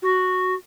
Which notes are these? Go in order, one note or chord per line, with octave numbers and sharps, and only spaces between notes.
F#4